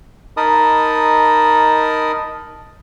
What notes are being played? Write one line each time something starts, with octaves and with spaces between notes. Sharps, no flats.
D#4 A#4 D#5 A5 B5 D#6